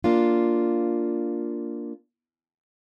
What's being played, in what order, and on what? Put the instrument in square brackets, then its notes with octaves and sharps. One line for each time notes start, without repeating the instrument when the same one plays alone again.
[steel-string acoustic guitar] A#3 D4 F4